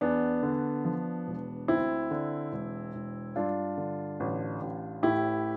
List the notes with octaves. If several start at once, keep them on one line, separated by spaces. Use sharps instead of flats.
E2 B3 D4
D3
F3
E1
D2 C4 E4
D3
E1
E1
G2 D4 F4
D3
A1
A1
A2 E4 G4